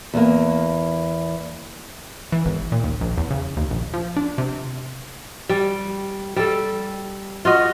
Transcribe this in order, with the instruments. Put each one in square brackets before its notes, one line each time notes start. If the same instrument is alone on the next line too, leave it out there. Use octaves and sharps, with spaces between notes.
[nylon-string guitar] E2 A#3
[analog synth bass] E3
G#1
A#2
D#2
A#1
E2
C#3
D#2
A#1
F3
D4
C3
[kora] G3
G3 A4
F4 F#4 D#5